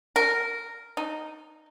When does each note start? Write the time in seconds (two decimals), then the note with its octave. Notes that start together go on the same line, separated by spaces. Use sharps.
0.16 A#4
0.97 D#4